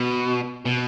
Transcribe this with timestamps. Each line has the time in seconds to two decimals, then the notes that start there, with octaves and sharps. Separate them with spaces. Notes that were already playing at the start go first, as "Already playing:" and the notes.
Already playing: B2
0.66 B2